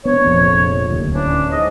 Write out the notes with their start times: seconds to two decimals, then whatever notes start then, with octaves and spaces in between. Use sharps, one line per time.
0.05 B3 D4 C#5
0.25 F1 A#1 F2
0.88 D1 D#2
1.13 E3 C#4 D4
1.51 G#2 D#5